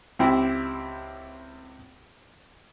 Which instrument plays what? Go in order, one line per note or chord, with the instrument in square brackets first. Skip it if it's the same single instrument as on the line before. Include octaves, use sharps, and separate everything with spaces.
[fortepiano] C#2 C4 E4 G4